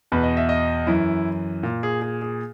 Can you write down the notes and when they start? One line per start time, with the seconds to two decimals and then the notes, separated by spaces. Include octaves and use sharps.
0.12 E2 B2 B4
0.23 D#5
0.37 E5
0.49 D#5
0.87 F#2 E3 E4
1.63 A#2
1.83 G#4
2.02 G#4
2.22 G#4